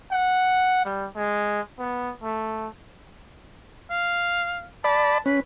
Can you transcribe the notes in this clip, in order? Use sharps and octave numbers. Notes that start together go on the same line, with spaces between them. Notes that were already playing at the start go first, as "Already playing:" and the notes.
F#5
G3
G#3
B3
A3
F5
D5 A5 B5
C#4 B4